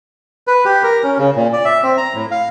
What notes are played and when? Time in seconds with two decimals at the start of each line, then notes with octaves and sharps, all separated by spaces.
0.47 B4
0.65 G4
0.83 A#4
1.03 C#4
1.18 C#3
1.36 A#2
1.53 D5
1.65 E5
1.83 C4
1.98 A#5
2.15 A2
2.31 F5